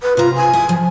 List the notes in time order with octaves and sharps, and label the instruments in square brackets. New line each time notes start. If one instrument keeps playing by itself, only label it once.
[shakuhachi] B4
[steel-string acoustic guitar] C3 A#5 [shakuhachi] F4
[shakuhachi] G#5
[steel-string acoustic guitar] E4
F3